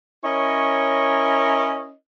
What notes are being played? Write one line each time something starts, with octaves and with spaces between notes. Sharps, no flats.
C#4 E4 A#4 C#5 D#5